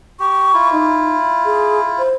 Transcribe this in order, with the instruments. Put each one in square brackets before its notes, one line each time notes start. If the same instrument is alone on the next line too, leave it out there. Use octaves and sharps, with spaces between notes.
[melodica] G4 [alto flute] C#6
[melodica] E4 F4
[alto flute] D#4
G#4
C5